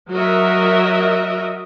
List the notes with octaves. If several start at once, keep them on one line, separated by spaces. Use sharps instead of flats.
F#3 F#4 A#4 D#5 E5